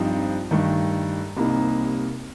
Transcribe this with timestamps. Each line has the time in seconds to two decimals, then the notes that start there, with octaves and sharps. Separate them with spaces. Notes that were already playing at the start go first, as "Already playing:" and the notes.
Already playing: G2 F3 C4 D#4
0.51 G2 D#3 A3
1.37 C2 C3 G3 A#3 D#4